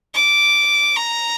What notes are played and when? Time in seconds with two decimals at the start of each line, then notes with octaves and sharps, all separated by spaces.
0.15 D6
0.97 A#5